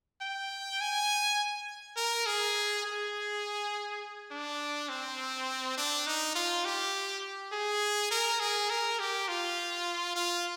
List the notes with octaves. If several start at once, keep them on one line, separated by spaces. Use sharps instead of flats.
G5
G#5
A#4
G#4
G#4
D4
C4
D4
D#4
F4
G4
G#4
A#4
G#4
A#4
G4
F4
F4